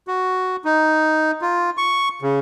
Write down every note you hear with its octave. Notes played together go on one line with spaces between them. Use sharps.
F#4
D#4
F4
C#6
C#3